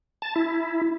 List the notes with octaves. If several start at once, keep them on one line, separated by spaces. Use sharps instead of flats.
A5
E4